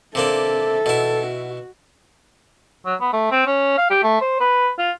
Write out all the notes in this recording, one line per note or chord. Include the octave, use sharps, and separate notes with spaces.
C3 A#3 D4 A4 E5
B2 E4
F#4
F#3
B3
A3
C4
C#4
F5
G4
A3
C5
B4
F4